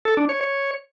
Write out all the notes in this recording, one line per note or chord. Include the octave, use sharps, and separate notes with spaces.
A4
D4
C#5
C#5